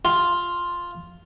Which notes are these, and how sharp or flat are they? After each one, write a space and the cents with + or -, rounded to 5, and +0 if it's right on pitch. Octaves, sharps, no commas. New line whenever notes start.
F4 +0